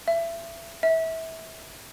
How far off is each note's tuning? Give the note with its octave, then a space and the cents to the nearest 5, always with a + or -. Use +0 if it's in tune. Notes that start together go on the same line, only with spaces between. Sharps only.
E5 +25
E5 -25